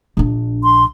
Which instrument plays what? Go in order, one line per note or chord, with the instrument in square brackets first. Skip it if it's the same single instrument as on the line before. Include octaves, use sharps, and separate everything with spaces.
[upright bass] A#1 D4
[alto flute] C6